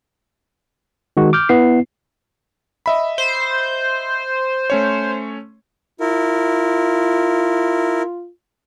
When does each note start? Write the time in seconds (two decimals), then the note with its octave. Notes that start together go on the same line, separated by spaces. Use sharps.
1.17 D#3 G#3 F#4
1.33 D6 F6 G6
1.49 B3 E4 C7
2.86 D#5 E5 B5
3.18 C5
4.70 A3 C#4 C#5
6.00 E4 F4 A#4